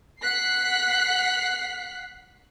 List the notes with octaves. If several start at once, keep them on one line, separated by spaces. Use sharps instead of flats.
F#5 F#6 B6 C7